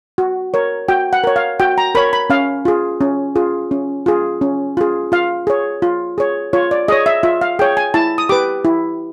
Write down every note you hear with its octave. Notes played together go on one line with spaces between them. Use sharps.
F#4
A#4 C#5
F#4 G5
F#5
A#4 C#5
F5
F#4 G5
A#5
A#4 C#5 B5
B5
C#4 F5
F4 G#4
C#4
F4 G#4
C#4
F4 G#4
C#4
F4 G#4
F4 F5
G#4 C#5
F4
G#4 C#5
F4 C#5
D5
G#4 C#5 D#5
E5
F4 E5
F5
G#4 C#5 G5
G#5
E4 A5
D#6
G4 B4 D6
E4